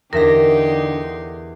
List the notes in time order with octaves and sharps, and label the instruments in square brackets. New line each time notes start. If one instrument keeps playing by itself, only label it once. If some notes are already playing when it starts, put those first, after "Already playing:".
[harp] E2 E5 A#6 [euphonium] D3 [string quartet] D#4 G4 C6 [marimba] A#4